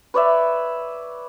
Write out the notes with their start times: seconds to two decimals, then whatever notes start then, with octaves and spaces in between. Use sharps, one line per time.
0.14 B4 C#5 D5 E5